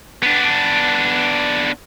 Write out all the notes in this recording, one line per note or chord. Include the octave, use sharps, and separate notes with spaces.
B3 D4